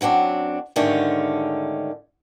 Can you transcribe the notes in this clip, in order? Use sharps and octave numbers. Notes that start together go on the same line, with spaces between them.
F#2 F#3 C4 D4
G#2 D3 D#3 A3 C#4 G4